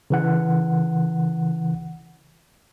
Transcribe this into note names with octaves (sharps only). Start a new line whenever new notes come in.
C#3 E3 F#5